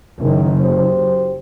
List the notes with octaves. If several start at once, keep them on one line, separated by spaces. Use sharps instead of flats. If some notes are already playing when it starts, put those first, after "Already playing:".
F#1 D#3
F#3 G4 C5